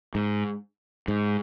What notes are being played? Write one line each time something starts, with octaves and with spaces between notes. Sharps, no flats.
G#2
G#2